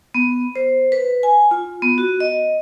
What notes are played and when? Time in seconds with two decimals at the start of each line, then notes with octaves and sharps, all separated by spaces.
0.14 B3
0.56 C5
0.92 B4
1.23 G#5
1.51 F4
1.82 B3
1.98 F#4
2.20 D#5